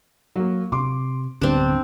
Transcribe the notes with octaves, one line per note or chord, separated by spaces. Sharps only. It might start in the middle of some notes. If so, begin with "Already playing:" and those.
F#3 A#3
C3 C6 D6
D1 G2 D3 B3 C4 D4